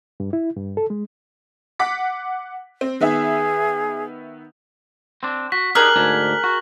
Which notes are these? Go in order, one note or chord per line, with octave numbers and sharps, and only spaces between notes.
G2
E4
G2
A4
G#3
F#5 D6 B6
C4
D#3 B3 G#4 E5
C4 D4
F#4 B6
D4 D#4 G4 G#4 A#4 F6 F#6 F#7
D2 G#2 D4
F#4